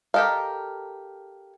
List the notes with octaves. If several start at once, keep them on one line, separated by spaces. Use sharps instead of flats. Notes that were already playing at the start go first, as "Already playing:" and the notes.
G4 A4 A#4 D#5 F5